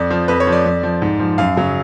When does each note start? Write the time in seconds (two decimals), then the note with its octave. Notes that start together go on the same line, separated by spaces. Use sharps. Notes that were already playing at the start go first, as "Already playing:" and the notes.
Already playing: F2 D5
0.11 F3
0.28 F2 B4
0.40 C#5
0.47 F3
0.52 D5
0.66 F2
0.83 F3
1.02 G#2
1.20 F3
1.38 F#2 F5
1.57 C#3 F#3